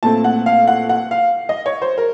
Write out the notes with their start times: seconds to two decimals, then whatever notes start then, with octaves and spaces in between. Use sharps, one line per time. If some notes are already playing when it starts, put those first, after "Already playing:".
0.03 A#2 A3 C4 A5
0.24 F#5
0.46 F5
0.68 F#5
0.89 F#5
1.11 F5
1.49 D#5
1.66 C#5
1.82 C5
1.98 A#4